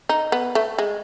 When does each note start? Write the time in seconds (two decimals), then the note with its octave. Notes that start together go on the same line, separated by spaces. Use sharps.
0.09 D#4
0.32 B3
0.55 A3
0.78 G#3